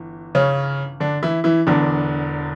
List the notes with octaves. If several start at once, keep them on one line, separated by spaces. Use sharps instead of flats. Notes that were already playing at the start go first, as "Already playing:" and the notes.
Already playing: G1 E3
C#3 C#4
D3 D4
E3 E4
E3 E4
E1 E2 D3 E3 D4